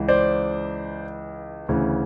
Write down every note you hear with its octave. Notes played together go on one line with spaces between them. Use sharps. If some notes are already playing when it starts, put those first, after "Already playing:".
Already playing: C#2 C#3 E3
C5 D5
D2 C#3 E3